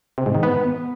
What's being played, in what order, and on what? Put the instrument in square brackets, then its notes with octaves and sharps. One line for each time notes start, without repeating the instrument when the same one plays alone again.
[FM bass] C3
G#2
D#3
B3